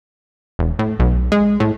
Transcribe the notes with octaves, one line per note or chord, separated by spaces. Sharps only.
E1
A2
B1
G#3
A2